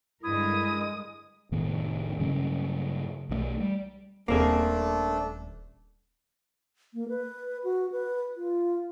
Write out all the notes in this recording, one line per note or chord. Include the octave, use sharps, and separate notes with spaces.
G2 D3 G#3 E4 A#4 D#6
F1 A2 D#3 B3
G2 C#3 F#3 C#4
B1 D#3 A3
G3
D#1 A3 A#3 C4 D4 G#4
A#3
B4
F#4
B4
F4